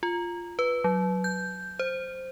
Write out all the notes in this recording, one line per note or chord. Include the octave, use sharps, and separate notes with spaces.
F4
B4
F#3
G6
C5